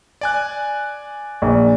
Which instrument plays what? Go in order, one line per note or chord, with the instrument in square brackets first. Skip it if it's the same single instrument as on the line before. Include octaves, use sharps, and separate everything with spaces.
[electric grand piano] D5 G#5 F#6
[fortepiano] A#1